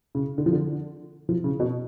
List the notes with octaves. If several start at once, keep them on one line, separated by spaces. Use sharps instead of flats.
C#3
D3
F3
D3
F3
C#3
B2